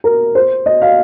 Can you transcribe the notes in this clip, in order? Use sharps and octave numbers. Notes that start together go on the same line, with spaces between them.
A#4
C5
D#5
F5